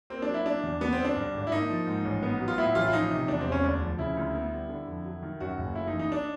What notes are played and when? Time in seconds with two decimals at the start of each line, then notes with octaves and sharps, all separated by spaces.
0.10 A#3 C4
0.22 D4
0.28 F#3
0.34 E4
0.45 B2 D4
0.63 E2
0.81 F#3 B3
0.93 C4
0.99 D3
1.05 D4
1.16 G2
1.34 G#1
1.47 E4
1.52 A#3 D#4
1.69 F3
1.87 G#2
2.05 A1
2.23 B3
2.40 F#3
2.48 F4
2.58 A2 E4
2.75 A1 F4
2.87 E4
2.93 F3 D#4
3.10 C3
3.28 E2 D4
3.41 C4
3.46 E1
3.52 C#4
3.64 D2 D4
3.82 F3
3.99 C#3 E4
4.17 D2
4.35 B3
4.52 G3
4.69 D3
4.87 F2
5.05 F#3
5.22 D#3
5.40 F#2 F#4
5.58 F#1
5.75 A3 E4
5.87 D#4
5.94 E3
5.99 D#4
6.12 D4